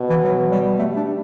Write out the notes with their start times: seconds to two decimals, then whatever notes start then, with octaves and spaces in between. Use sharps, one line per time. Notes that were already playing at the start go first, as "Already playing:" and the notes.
Already playing: B2
0.10 E3
0.24 F#3
0.51 G3
0.78 G3 A3
0.96 D4